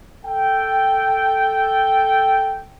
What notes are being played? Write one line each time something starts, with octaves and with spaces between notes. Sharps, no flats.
A4 G5